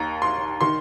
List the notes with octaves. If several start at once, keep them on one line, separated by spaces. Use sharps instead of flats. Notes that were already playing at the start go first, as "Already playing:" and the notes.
Already playing: D#2 D#3 A#5
C6
D#3 C6